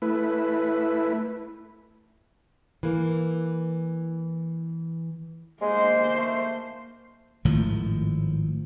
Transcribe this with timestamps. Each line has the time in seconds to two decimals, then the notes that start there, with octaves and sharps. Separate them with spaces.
0.02 A3 E4 B4
2.83 E3 A#3
5.61 G#3 A#3 C5
6.17 A3
7.45 G#1 A2 D#3 F3